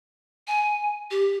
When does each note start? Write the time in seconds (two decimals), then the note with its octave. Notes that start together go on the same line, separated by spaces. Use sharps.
0.48 G#5
1.11 G4